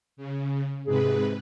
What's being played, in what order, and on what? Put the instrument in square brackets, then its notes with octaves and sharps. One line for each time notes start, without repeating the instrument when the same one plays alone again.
[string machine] C#3
[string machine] G#2 C3 B4 [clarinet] G#4